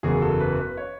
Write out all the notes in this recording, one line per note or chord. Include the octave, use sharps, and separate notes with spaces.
F#1 E2 C#3 F#3 G#4
A4
B4
B4
C#5